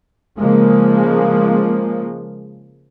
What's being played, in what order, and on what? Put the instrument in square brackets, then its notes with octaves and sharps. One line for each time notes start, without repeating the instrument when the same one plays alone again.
[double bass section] C#3 F3 G#3 A#3